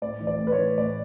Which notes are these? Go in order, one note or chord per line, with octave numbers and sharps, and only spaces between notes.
A2 D5
E3
D5
A2
B4
C#5
E3
A2 D5